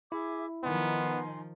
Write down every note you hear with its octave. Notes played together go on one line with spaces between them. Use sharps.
E4 G#4 E5 D6
D#3 F3 B3 D#4 G#5 C6